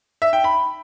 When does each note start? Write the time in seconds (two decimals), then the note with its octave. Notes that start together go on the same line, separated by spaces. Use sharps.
0.22 E5
0.33 G5
0.44 B5